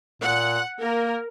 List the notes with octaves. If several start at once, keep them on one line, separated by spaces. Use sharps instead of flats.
A#2 F#5
A#3 A#4